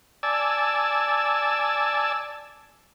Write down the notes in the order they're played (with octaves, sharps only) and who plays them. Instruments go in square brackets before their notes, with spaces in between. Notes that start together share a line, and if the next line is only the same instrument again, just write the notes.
[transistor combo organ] D5 G#5 A5 E6